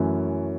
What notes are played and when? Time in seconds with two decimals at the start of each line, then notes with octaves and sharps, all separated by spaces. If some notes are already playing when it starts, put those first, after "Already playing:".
Already playing: F#2 E3 A3 C#4